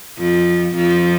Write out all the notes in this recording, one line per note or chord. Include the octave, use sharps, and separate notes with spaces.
F2 F3
F2 F3